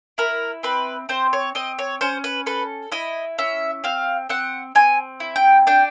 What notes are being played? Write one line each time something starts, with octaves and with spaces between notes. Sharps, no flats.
E4 A#4
C4 B4
C4 C5
C#5
C4 D#5
C#5
C#4 C5
B4
A4 B4
E4 D#5
C#4 E5
C4 F5
C4 F#5
C4 G#5
E4
G5
D4 G5